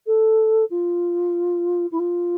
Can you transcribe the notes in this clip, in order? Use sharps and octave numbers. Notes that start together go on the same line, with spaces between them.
A4
F4
E4
F4